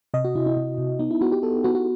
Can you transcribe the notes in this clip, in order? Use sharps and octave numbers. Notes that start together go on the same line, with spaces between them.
C3 D#5
F#4
C3 E4
E4
C3
C3
B3 D#4
E4
B3 F#4
G4
B3 A4
B3 F#4
F#4